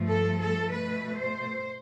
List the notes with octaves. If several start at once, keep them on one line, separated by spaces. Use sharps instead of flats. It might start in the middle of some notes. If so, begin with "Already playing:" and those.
Already playing: G2 F3 A3
A4
A4
B2 A3 B4
C5